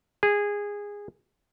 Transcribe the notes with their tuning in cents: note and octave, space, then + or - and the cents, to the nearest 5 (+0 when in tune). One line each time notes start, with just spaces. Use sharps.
G#4 -15